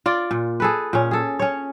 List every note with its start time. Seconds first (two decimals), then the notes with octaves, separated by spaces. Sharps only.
0.06 F4 D5
0.31 A#2
0.60 G#4 A4 B4
0.93 A#2 C#4
1.11 G#4 A4
1.39 C#4 C#5